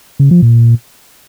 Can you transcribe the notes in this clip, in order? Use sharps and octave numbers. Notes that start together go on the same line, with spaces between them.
C#3
F3
A#2